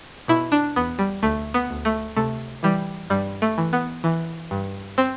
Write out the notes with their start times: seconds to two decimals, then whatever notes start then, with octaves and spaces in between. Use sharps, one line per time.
0.28 B2 E4
0.52 D4
0.76 E2 B3
0.99 G3
1.23 D2 A3
1.54 B3
1.70 D2
1.85 A3
2.17 C3 A3
2.63 E3 G3
3.10 G2 G3
3.42 A3
3.58 E3
3.73 B3
4.04 E3
4.51 G2
4.98 C4